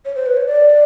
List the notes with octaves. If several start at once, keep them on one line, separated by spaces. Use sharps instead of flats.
C#5
C5
B4
C#5
D5